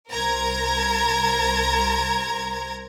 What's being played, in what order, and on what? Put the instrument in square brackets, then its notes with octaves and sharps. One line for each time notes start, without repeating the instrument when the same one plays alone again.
[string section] C2 A#4 C5 A#5 G#6